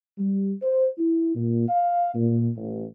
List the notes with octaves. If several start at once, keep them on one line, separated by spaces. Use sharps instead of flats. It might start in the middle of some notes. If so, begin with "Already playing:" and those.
G3
C5
E4
A#2
F5
A#2
A1